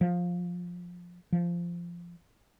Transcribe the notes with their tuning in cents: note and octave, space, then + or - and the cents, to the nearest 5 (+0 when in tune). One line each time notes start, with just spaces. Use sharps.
F3 +15
F3 -15